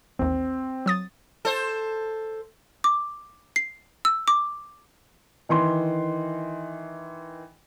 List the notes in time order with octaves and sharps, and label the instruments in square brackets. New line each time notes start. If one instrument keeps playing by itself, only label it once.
[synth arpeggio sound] A1 D#2 [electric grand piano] C4
[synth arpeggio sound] F#3 D#6 A6
[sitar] A4 C5
[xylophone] D6
C7
E6
D6
[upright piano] D#3 E3 C6